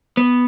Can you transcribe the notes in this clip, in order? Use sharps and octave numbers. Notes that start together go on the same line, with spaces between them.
B3